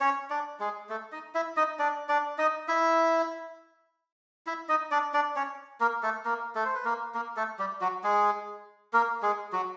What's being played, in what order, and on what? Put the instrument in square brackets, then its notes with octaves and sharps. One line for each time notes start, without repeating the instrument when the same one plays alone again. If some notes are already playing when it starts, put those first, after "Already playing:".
[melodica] C#4 C#5
D4 D5
G#3 G#4
A3 A4
D#4 D#5
E4 E5
D#4 D#5
D4 D5
D4 D5
D#4 D#5
E4 E5
E4 E5
D#4 D#5
D4 D5
D4 D5
C#4 C#5
A#3 A#4
A3 A4
A#3 A#4
A3 A4
C5
B4
A#3 A#4
A#3 A#4
A3 A4
G3 G4
F#3 F#4
G#3 G#4
A#3 A#4
G#3 G#4
F#3 F#4